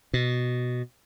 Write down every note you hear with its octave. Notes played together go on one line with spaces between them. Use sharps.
B2